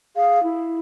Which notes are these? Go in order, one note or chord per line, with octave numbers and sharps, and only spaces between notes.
G#4 F5
E4